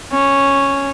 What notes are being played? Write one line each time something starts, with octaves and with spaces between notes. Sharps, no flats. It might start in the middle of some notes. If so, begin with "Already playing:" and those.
C#4